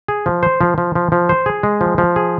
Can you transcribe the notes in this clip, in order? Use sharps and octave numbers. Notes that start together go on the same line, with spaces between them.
G#4
F3
C5
F3
F3
F3
F3
C5
G#4
G#3
F3
F3
G#4